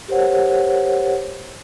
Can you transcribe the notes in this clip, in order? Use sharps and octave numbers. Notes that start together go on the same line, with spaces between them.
G4 A#4 C5 C#5 F#5